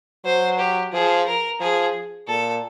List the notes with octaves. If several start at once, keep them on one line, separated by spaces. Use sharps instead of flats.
F#3 C5
G4
F3 G#4
A#4
F3 G#4
A#2 A4